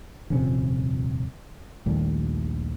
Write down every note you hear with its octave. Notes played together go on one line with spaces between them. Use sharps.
D#1 F2 C3 C#4
A#1 D#2 G3 A3